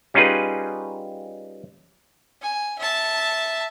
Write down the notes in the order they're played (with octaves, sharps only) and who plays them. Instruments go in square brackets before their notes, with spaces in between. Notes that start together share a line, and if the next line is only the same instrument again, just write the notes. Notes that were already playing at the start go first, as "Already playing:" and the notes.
[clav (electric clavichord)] G3 C#4 D#4 F4 G#4 B4
[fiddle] G#5
E5 A5